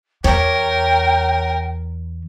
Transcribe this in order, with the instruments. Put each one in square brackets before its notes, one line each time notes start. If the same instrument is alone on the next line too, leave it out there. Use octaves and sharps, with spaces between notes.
[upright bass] E2 [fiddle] A#4 [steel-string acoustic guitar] C#5 [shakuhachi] G5